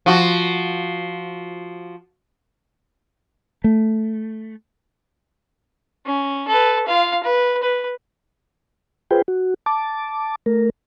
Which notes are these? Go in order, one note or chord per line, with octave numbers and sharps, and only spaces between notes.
F3 F#4
A3
C#4
A4 B4
F4 F5
B4
B4
F4 G#4 B4 C5 G5
F#4
A5 D6
A3 A#4